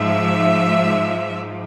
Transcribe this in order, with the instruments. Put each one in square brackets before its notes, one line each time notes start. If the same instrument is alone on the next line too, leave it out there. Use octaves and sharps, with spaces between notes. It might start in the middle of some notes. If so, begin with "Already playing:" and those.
Already playing: [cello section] G#2 F3 E5